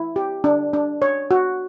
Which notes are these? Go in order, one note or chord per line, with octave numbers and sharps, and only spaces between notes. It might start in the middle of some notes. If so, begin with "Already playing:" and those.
Already playing: E4
G4
D4
D4
C#5
F#4